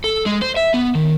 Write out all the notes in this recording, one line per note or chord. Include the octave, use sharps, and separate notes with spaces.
A4
G#3
C5
E5
B3
D#3